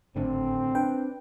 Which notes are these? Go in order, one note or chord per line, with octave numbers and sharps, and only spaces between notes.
G#1 A2 D3 C4
D4 B4 G5